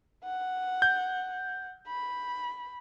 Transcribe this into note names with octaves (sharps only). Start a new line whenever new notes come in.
F#5
G6
B5